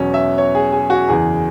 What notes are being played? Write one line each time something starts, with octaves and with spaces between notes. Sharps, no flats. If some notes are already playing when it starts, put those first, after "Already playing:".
Already playing: E2 B2 F#3 C#4
E5
C#5
G#4
G#4
F#4
F#1 E2 E3 G#4